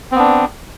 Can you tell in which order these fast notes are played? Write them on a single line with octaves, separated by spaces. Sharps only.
C4 B3 D4